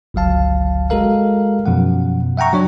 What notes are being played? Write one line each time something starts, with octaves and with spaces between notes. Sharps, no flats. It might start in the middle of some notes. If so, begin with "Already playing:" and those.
G1 C#2 F#3 F5 A5
G#3 F#4 A4 A#4 F5
F#2 B2 F3 F#5
E5 F#5 G5 A#5 C#6
F#3 D4 C#5